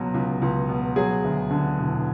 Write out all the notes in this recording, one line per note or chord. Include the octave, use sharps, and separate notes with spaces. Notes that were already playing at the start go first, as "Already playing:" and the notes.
Already playing: C#2 B2 F#3
C#2
C#2
B2
F#3 G#4
D2
D3
E1